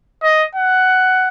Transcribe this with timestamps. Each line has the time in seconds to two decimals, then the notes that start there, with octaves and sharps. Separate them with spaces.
0.23 D#5
0.55 F#5